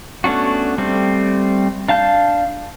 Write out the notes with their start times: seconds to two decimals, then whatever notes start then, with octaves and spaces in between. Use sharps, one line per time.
0.24 A3 B3 C#4 D4 F#4
0.78 G3 A3 C4
1.89 D4 F5 A5 G6